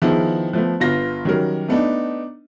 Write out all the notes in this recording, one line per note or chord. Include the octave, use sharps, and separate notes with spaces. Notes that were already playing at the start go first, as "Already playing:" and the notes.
D#3 F3 B3 E4 G#4
F3 A3 B3
G1 B3 F4 A#6
D#3 F#3 G3 C#4 A#4
A3 B3 D4 D#4